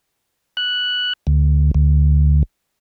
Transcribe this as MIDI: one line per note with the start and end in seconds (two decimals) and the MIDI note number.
0.57 1.13 90
1.27 1.71 38
1.75 2.43 38